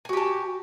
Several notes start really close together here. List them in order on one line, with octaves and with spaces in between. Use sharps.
G#5 F#4 G4 A5